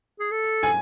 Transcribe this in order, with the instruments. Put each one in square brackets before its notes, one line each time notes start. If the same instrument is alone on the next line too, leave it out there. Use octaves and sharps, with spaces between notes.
[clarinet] G#4
A4
[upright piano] G#5